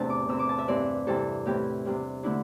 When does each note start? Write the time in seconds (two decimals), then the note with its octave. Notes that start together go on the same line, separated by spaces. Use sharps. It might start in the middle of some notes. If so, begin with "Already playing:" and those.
Already playing: E2 A2 C3 A3 D4 A5
0.10 D6
0.29 C3 E3 C4 E6
0.39 D6
0.49 A5
0.58 E5
0.68 G2 E3 C4 D5
1.07 C3 E3 G3 C4 A4
1.46 A2 E3 C4 G4
1.85 C3 G3 D4
2.23 D3 A3 D4 E4